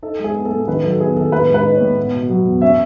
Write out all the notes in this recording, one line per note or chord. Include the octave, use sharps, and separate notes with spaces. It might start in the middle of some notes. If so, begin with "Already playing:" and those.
D#4 A4
G#3 G#4
B3
A4
A2
D#3 B4
F#3 A4
B3 G#4
D#3 A4
A2 B4
G#3
B4
D#4
A2 C#5
B3
B2
F#3
E2
C#4 E5